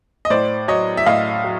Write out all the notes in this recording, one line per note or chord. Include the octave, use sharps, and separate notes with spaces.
D#5
A2 C5 D5
F#3 C#5 D#5
E5
A2 D#5 F5
F#3